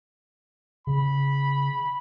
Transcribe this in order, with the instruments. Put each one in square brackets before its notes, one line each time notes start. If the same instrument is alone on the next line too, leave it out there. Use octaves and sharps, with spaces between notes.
[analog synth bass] C#3 [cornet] B5